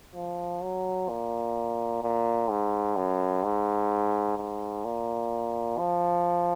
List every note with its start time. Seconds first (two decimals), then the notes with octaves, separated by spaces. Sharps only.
0.15 F3
0.62 F#3
1.09 A#2
2.03 A#2
2.50 G#2
2.96 F#2
3.44 G#2
4.37 G#2
4.85 A#2
5.78 F3